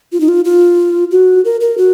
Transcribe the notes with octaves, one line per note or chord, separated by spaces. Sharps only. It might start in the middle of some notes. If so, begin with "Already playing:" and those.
F4
D#4
F4
F4
F#4
A#4
A#4
F#4